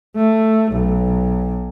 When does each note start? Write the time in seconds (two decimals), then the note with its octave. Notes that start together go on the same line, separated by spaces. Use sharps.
0.16 A3
0.72 B1